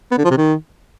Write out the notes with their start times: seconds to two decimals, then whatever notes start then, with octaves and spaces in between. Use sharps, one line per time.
0.11 B3
0.18 D3
0.24 F3
0.31 C3
0.37 D#3